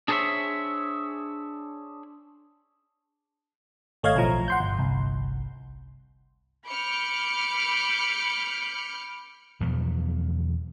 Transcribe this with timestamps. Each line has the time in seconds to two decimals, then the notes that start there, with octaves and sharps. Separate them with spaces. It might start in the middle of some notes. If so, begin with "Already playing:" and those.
0.08 D4 G#4 A4 C5 C#5 E5
4.03 G#1 A3 C#5 D#5 F5 G#6
4.15 B1 A2 F3 A#5
4.48 F#5 C6 G6
4.60 G1
4.79 G1 C2
6.67 B5 D6 F6 G6 C#7
9.60 E2 B2 F3 F#3